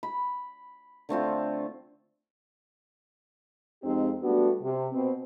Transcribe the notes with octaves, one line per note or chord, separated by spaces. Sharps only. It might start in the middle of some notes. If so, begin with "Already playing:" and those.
B5
D3 A3 C4 F4
F2 G#3 C4 D#4 G4
G3 A3 B3 D4 F#4
C3
B2 C4